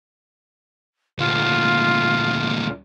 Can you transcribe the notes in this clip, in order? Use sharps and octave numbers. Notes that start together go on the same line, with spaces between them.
D2 A#2 F4